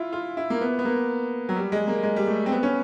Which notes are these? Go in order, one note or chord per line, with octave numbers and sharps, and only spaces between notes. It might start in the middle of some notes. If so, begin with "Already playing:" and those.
Already playing: E4 F4
F4
E4
A#3
B3
B3
A#3
F#3
G3
G#3
A#3
G#3
G3
A3
C4
B3
C#4